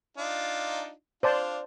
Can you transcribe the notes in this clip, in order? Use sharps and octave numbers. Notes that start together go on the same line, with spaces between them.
D4 D#4 F4
D4 F4 C5 D5 A5